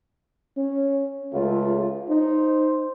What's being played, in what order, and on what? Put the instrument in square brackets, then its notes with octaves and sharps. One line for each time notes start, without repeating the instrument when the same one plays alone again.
[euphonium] C#4
[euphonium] C#2 [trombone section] A3 C#4 F4
[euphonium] D#4 [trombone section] C5